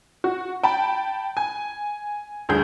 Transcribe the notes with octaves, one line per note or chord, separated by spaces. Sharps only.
F#4
G5 A5 B5
G#5
D2 G2 G#4 G6